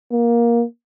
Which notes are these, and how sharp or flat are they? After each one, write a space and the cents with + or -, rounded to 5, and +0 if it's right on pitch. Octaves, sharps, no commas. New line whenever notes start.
A#3 +15